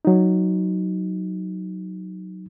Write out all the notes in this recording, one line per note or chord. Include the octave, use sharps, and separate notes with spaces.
F#3 D#4